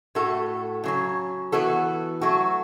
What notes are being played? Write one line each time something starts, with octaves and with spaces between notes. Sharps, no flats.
A2 A3 F#4 A4
C#3 F#3 C#4
E3 B3 F#4 A4
F#3 A3 F#4 A4